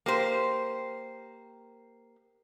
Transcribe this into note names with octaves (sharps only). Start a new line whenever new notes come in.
A#3 G4 C5